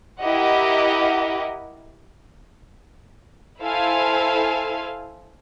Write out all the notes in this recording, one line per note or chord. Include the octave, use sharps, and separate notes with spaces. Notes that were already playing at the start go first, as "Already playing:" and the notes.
E4 G4 A#4 D#5 F#5
E4 A4 C5 F5 G#5